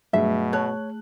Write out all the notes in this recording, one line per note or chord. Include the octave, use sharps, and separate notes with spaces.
G2 B2 F#3 A3 G#4 E5
C#5 A5 F#6